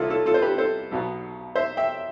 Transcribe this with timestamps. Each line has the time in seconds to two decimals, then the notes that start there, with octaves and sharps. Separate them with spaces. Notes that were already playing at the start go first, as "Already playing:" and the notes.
Already playing: C2 E4 F4 A4
0.10 F4 A4
0.26 F4 A4
0.34 C5
0.42 G4 B4
0.58 A4 C5
0.91 B1 B2 B3
1.55 C5 E5
1.77 E5 G5